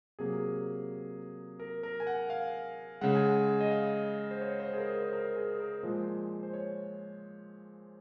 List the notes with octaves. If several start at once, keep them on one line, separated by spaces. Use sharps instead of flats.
C3 F#3 A#3 G#4
A#4
A#4
G#5
F#5
F5
C#3 G#3 F#5
G#5
F#5
D#5
F5
C5
C#5
C5
G#4
A#4
C5
A#4
G#4
A#4
A#2 F3 G#3 C5
C5
C#5